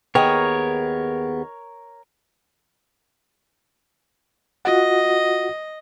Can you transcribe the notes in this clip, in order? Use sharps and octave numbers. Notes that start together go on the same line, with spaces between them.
D#2 B3 G#4 A#4 C#5 G5
F4 F#4 D#5 F#5